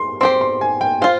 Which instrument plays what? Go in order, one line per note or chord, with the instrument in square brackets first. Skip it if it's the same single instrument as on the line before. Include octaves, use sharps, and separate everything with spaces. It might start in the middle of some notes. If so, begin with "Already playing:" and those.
Already playing: [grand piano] C6
[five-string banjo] C4 G4 C5 [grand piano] C6
[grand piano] C6
G#5
G5
[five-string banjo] F4 C5 [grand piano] F5